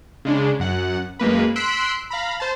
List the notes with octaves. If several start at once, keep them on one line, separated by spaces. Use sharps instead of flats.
C#3 G#3 D4
F#2 F#5
F#2 G#3 A#3 B4
C6 E6 F#6 B6 D7
F5 A#5 B5
C5 A5